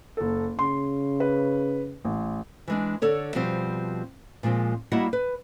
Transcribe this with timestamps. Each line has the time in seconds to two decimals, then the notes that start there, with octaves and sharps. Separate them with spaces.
0.17 F#1 A4
0.59 C#3 C6
1.20 B4
2.05 A1
2.68 E3 G#3 D4
3.02 D3 A4 C#5 D5
3.35 B2 F3 G3 C4
4.43 A#2 F3 G#3 C4
4.92 G3 A#3 E4 F#4 D#5 F#5
5.13 B4